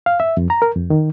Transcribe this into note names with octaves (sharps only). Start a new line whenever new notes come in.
F5
E5
F2
A#5
A#4
F2
D#3